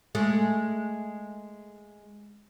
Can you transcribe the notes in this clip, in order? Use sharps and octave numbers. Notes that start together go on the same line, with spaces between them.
G#3 A3